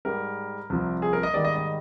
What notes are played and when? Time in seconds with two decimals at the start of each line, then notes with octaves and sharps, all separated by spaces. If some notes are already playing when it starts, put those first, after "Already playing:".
0.05 G#2 G3 A#4
0.70 C2 C3 F3
1.02 G#4
1.13 A#4
1.23 D#5
1.34 G#2 D#3 G3 D5
1.45 D#5
1.56 D#5